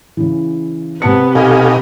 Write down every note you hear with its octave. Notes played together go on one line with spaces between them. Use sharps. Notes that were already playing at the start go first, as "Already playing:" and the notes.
C#3 E3
C3 B3 A5 C#7
B2 D#4 G4 A4 F5 G#5